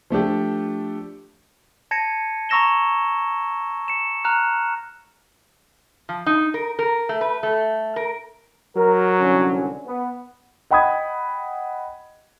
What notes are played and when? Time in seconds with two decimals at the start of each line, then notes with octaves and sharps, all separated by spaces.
0.10 F3 A3 D4 G4
1.91 A5 G#6 A#6 C#7 D#7
2.49 A#5 C#6 E6 A#6 E7 G7
3.88 C#7 E7
4.25 A#5 F6 F#6
6.09 F3
6.26 D#4
6.54 A#4
6.79 A#4
7.09 A3
7.21 B4
7.43 A3
7.96 A#4
8.76 F#3 A#4
9.20 C2 D3 C#4
9.85 B3
10.71 D#5 F#5 G5 B5 D#6 G#6